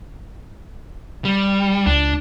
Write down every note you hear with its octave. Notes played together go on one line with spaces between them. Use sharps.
G3
C#2 D4